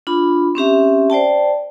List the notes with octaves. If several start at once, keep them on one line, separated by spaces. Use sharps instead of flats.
D4 F4 B5
C4 C#4 G4 E5
C5 D5 G5 A5